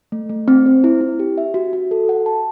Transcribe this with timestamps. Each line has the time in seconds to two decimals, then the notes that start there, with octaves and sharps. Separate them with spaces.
0.12 A3
0.29 A3
0.48 C4
0.66 C5
0.84 E4
1.01 E4
1.19 G4
1.38 E5
1.54 F#4
1.73 F#4
1.91 A4
2.09 F#5
2.26 A5